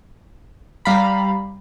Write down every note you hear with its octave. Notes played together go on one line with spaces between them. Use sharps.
G3 F5 A#5 B5